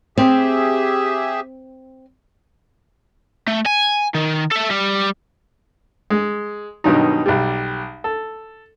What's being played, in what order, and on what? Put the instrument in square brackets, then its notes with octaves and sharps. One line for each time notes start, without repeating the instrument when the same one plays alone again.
[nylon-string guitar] C4 [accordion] G4 G#4 E5
[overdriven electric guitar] A3
G#5
D#3
A4 E5
G3
[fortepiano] G#3
G2 B2 D#3 F#3 D#4
B1 G3
A4